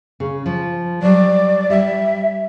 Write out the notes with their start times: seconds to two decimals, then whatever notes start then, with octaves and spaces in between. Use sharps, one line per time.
0.20 C#3
0.46 F3
1.02 F#3 G3 D5
1.70 G3 E5